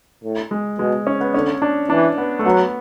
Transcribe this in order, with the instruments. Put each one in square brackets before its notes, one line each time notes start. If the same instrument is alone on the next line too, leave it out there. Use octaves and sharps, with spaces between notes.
[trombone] A2
[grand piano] G#3
[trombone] B2 [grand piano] G#3
[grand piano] C#4
B3
[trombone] D3 [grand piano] C#4
[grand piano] D4
[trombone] E3 [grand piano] D4
[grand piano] B3
A3
[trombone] F#3 [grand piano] B3